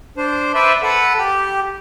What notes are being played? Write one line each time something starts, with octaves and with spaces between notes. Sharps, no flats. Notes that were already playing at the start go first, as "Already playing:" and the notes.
D4 C5
B4 C5 D5 E5
A4 B4 F#5
G4